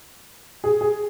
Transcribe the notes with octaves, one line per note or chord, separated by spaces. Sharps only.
G#4
G#4